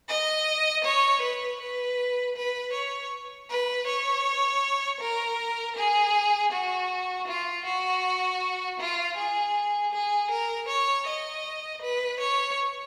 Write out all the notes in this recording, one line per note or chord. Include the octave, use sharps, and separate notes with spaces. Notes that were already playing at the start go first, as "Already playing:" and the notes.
D#5
C#5
B4
B4
B4
C#5
B4
C#5
A#4
G#4
F#4
F4
F#4
F4
G#4
G#4
A#4
C#5
D#5
B4
C#5